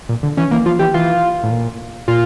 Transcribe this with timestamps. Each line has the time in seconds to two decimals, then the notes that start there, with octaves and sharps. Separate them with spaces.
0.09 A#2
0.23 D3
0.37 E3 C#4
0.51 E3 A#3
0.66 F3 F4
0.79 E3 G4
0.94 E3 F4
1.43 A2
1.51 A#2
2.08 A#2 F4